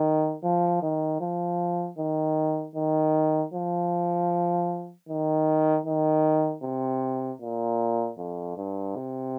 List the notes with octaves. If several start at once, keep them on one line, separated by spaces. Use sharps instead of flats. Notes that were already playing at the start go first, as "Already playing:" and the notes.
Already playing: D#3
F3
D#3
F3
D#3
D#3
F3
D#3
D#3
C3
A#2
F2
G2
C3